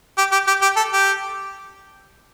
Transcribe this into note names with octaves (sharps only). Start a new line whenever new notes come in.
G4
G4
G4
G4
A4
G4